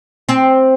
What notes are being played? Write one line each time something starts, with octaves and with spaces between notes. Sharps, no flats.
C4